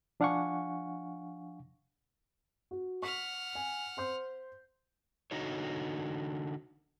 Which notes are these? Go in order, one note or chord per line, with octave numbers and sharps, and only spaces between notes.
F3 D4 F5 F#5 G#5 C#6
F#4
F#5 C#6 F6 B6
G#5
C5 C6 G6
D3 D#4 F#4 C#5